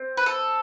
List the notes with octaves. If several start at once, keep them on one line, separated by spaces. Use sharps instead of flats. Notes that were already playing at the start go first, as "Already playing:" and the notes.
Already playing: C4
B4
A4